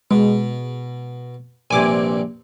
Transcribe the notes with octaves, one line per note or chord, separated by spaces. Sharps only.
B2 G#3
A#1 G2 C3 G#5 D6